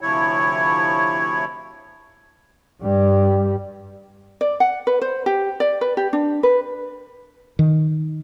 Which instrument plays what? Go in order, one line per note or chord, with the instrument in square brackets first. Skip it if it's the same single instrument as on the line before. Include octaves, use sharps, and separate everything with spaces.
[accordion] D2 C3 F3 E4 C#5
[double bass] G2 G3
[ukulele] D5
F#5
B4
C5
G4
D5
B4
G4
D4
B4
[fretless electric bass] D#3